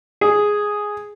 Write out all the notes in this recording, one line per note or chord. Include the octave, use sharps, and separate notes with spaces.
G#4